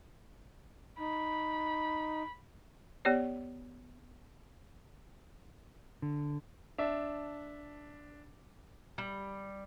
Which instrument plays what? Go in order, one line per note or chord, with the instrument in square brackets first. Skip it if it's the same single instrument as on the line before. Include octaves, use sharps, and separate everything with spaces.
[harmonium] D#4 [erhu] B5
[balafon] B3 G4 C#5 D5
[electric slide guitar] D3
[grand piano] D4 E5
[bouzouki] G3